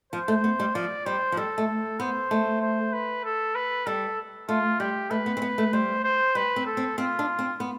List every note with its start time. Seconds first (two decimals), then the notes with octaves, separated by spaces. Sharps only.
0.13 F3 C5
0.28 A3
0.44 B3
0.59 G3
0.74 F3 D5
1.06 G3 C5
1.32 F3
1.37 G3 A4
1.58 A3
2.00 B3 C5
2.31 A3
2.62 C5
2.93 B4
3.24 A4
3.55 B4
3.86 G3 A4
4.49 A3 F4
4.80 G3 G4
5.10 A3 B4
5.26 B3
5.37 C4
5.42 B3
5.58 A3
5.73 G3 C5
6.04 C5
6.35 G3 B4
6.56 C4
6.66 A4
6.77 C4
6.98 C4 F4
7.19 D4
7.39 C4
7.60 B3